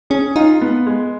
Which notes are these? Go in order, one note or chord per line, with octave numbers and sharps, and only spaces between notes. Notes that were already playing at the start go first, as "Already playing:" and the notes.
C#4 G#4
D#4 F4
B3
G#3